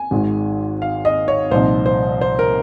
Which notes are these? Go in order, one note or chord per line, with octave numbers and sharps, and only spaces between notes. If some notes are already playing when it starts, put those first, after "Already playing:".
Already playing: G#5
G#1 G#2 D#3 G#3
F5
D#5
C#5
C2 A#2 F3 C4 D#4 C5
C5
C5
A#4